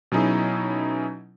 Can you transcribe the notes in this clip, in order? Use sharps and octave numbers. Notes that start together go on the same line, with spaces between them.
B2 F#3 C#4 D#4 E4 G#4